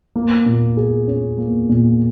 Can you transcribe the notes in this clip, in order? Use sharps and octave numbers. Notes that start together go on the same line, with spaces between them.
A#3
A#2
G#4
C#4
A#3
A#2